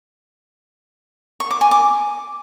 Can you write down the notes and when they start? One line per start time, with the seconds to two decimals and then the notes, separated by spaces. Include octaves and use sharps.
1.40 C#6
1.51 D6
1.61 G#5
1.71 D6